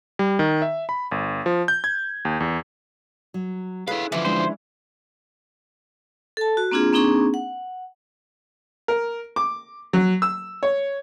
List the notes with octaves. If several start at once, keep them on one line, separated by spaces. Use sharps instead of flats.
G3
D#3
E5
B5
G1
F3
G6
G#6
D#2
E2
F#3
E4 G#4 A4 B4 C#5 F5
D3 E3 F3 C#4
G#3 C#4 D4 C5
A4 A5
F#4
A#3 C4 D4 F4 G#4
A#3 C4 D4 D#4 G#4 C#6
F#5
A#4
D6
F#3
E6
C#5